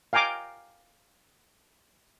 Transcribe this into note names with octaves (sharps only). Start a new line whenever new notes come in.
F5 G5 G#5 A#5 D6